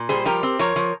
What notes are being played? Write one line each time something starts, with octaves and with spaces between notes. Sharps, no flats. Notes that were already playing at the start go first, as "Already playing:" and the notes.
Already playing: A#2
G3 G#4 C5
F3 G4 A#4
C4
F3 A#4 C#5
F3